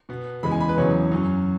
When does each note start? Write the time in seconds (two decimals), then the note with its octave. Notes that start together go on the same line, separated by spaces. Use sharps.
0.09 B2 B3
0.43 E2 C#3 G#3 B5
0.51 G#5
0.60 B5
0.69 B4
0.77 E2 C#3 F#3 C#5
1.11 F#2 F#3 C#4